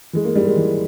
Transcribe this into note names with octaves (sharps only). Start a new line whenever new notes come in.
E3 G#3
A#3
G#2 G3
G#3
E3